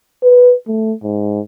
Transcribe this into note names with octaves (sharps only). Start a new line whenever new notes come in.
B4
A3
G#2